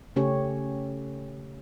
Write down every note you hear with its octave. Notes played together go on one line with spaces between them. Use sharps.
C#3 A3 C#4 G4 C#5